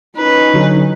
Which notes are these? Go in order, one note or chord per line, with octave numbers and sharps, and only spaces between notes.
C#4 D#4 B4
D3 F#3